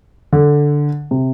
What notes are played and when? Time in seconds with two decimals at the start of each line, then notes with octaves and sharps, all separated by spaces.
0.33 D3
1.11 C3